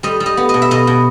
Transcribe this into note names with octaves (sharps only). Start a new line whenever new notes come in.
G3 D#5
G3
D#5
B3
D#5
B2
E5
B2 D#5
B2